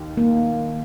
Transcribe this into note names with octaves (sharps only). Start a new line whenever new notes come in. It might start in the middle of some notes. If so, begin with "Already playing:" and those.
Already playing: D#2 D#3
A#3